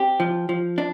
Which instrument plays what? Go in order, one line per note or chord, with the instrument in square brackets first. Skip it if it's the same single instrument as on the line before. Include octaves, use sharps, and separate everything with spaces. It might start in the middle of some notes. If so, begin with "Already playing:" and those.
Already playing: [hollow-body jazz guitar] C4 G4
F3
F3
D4